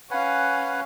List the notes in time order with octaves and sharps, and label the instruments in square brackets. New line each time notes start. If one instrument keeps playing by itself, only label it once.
[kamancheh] C#4 F5 [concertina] B4 F#5 G#5